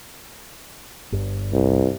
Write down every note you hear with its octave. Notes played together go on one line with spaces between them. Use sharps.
G1 G2
C2